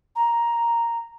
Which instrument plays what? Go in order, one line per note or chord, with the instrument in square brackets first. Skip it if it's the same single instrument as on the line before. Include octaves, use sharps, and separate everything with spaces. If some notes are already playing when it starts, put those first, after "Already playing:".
[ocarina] A#5